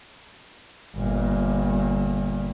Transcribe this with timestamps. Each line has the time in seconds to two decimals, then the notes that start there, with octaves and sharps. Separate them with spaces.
0.96 G1 A#2